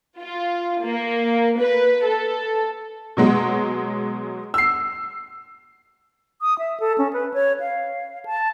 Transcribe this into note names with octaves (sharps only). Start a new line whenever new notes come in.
F4
A#3
B4
A4
B2 F#3 G#3
E6 C7
D#6
E5
A4
C#4
B4
C#5
F5
A5